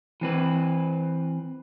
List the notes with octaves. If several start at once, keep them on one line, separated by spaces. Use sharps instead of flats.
E3 C4 B4